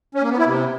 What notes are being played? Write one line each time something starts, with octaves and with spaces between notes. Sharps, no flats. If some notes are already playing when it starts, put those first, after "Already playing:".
C#4
A#3
B3
E4
C3